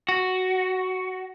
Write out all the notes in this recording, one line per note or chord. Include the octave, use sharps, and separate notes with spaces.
F#4